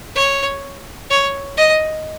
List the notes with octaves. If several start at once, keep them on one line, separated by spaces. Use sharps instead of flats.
C#5
C#5
D#5